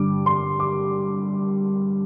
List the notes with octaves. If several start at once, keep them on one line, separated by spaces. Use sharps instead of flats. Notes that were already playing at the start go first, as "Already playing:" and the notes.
Already playing: G2 D3 G3 D6
C6
D6